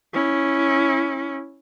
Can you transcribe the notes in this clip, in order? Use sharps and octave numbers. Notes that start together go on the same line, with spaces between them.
C#4 E4